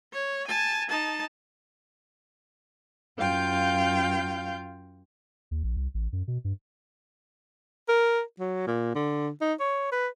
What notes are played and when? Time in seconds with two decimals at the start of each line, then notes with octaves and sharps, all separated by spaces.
0.12 C#5
0.47 G#5 A5
0.89 D#4 A5
3.19 F#2 F4 F5 G5 G6
5.51 D#2
5.64 A#1
5.77 C2
5.94 A1
6.13 F#2
6.28 B2
6.44 G2
7.88 A#4
8.39 F#3
8.67 A#2
8.95 D3
9.41 D#4
9.60 C#5
9.92 B4